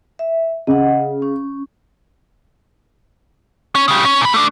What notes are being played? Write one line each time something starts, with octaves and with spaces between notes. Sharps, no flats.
E5
C#3 D#5 F#5
C#4
C#4
C#3 G3
C#4
A#2 B5
A3 D4